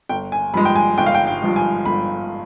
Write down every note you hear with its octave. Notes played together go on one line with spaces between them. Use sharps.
G1 G5
G#5
G2 F3 G#3 B5
G5
G#5
G1 G5
F5
G5
G5
G2 F3 G#3
G#5
G1 B5